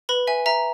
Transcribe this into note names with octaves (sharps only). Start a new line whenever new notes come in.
B4 B5
E5 G#5
E5 A#5